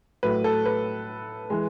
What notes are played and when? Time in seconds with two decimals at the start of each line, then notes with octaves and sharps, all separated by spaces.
0.23 A2 F#3 A3 B4
0.44 A4
0.66 B4
1.50 E3 G#3